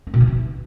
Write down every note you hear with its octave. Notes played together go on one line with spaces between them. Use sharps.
D#4
B2
E3
D#4